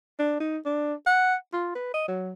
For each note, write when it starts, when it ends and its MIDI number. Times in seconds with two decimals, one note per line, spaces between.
0.19 0.37 62
0.40 0.58 63
0.65 0.94 62
1.07 1.35 78
1.53 1.71 65
1.75 1.94 71
1.94 2.06 75
2.08 2.33 54